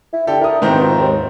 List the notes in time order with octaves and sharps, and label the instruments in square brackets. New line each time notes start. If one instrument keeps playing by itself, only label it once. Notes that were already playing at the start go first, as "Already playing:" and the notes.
[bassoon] E4
[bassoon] D3 [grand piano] G4 A4
[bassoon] E4 [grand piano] A#4 D#6
[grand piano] G#2 D#3 C4 [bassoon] B2
[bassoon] F3
D#2